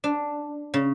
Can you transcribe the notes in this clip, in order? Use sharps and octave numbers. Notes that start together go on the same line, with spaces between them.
D4
C#3